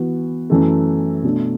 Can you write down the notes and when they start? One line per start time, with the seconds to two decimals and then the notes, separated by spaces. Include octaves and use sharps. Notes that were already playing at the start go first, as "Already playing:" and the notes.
Already playing: E3 B3 F#4
0.50 F#2 E3 A3
1.23 B2 A3 D4